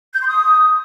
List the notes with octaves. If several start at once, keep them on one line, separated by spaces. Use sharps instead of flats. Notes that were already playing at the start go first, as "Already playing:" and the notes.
G6
C6
D#6